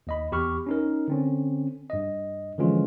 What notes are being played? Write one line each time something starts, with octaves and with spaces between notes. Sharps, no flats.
D#2 D#5 B5
E2 G4 B5 C#6 F6
C#4 D#4 A#4
D3 C4 C#4
G2 D#5
D3 E3 F3 G#3 C#4 F4